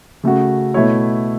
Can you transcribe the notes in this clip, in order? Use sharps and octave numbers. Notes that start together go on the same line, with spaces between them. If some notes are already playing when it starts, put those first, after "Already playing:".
C#3 A3 F#4
B2 A3 E4 C#5